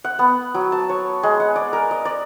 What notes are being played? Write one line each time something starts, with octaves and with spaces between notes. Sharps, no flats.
F#5
B3
F#3
A5
C#5
G#3
F#5
D5
A#4
D#5
D5